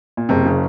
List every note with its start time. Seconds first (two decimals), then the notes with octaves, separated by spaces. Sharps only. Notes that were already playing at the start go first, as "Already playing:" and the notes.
0.17 A#2
0.29 F#1 C3
0.46 C#3